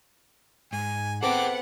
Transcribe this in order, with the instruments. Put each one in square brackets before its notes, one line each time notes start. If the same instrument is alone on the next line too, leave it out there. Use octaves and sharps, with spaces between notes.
[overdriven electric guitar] G#2 [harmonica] G#5
[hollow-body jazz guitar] B3 C4 A4 [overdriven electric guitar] G#4 G5 [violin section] F#5 [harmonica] D6